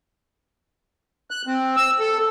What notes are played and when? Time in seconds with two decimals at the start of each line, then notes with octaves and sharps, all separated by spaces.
1.31 F#6
1.47 C4
1.76 E6
2.00 A4